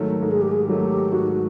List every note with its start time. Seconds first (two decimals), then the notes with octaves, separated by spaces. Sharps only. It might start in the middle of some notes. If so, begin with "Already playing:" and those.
Already playing: G#2 D#3 F#3 A3
0.21 G#2 A4
0.31 G#4
0.42 G4
0.51 G#4
0.67 D#3 F#3 A3 G4
1.12 G#2 F#4